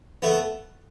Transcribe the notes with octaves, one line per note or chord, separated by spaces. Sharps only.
A3 B3